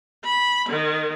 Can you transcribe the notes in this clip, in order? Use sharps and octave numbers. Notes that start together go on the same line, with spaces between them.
B5
D#3